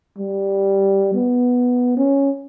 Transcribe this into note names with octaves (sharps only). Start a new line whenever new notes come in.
G3
B3
C#4